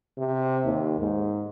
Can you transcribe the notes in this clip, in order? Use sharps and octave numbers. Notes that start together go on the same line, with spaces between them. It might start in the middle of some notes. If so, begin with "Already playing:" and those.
C3
D#2
G#2